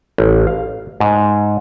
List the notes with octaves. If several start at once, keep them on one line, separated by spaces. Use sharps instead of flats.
A1
F5
G#2